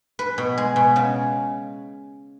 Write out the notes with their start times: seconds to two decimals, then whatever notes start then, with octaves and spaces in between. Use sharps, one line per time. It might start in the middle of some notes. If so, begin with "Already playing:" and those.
0.19 B4
0.38 B2
0.58 G#3
0.76 B2
0.96 C#3